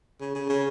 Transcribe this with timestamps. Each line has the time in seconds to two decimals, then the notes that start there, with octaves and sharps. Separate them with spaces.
0.20 C#3
0.35 C#3
0.49 C#3